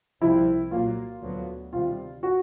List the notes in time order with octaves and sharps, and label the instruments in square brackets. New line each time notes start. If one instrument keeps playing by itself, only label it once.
[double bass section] C2 C3 F3 [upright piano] E4
[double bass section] A#2 F#3 A#3 [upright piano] F4
[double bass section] D2 D3 F#3 B3
[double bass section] C3 D#3 G3 [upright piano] F4
[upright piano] F#4